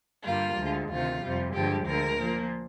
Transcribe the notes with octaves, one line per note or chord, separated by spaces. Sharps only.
G2 D3 G3 A#3 F4
D2 D3 G#3
D2 C3 D#3 F4
F2 C3 G3
G2 D3 F3 G#3 G4
D2 D3 G#3 A#4
A#2 F3 A#3